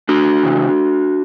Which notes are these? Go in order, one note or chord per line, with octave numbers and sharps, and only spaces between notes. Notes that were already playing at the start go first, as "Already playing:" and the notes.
D4 F#4
C#3 E3